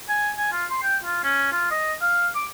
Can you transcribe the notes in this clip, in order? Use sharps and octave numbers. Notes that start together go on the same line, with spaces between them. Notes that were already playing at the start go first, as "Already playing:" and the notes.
G#5
G#5
F4
C6
G5
F4
C#4
F4
D#5
F5
D6